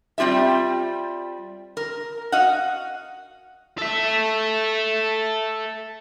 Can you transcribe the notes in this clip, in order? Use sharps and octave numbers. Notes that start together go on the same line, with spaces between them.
G3 C4 F4 G4 E5
A#4
F#4 D#5 F5 F#5
A4 E5